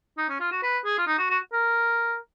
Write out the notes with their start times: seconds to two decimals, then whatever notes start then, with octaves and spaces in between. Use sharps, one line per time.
0.18 D#4
0.29 C#4
0.40 F4
0.51 F#4
0.62 B4
0.85 G#4
0.98 F4
1.07 D#4
1.18 F#4
1.30 F#4
1.53 A#4